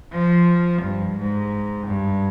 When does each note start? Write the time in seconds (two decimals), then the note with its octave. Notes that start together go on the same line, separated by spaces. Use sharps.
0.12 F3
0.83 G2
1.18 G#2
1.87 G2